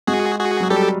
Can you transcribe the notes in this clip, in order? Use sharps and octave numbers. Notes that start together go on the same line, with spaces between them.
G#3 F#4 G#4
F#4 G#4
F#3
G3 G4 A4